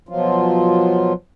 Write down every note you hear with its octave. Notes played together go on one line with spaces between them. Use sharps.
B2 F3 F#3 F4